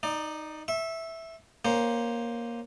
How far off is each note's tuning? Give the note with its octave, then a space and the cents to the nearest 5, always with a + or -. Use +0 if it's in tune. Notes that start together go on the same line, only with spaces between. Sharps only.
D#4 +0 D5 +25
E5 -5 C#6 -45
A#3 +10 C#4 -5 C5 +0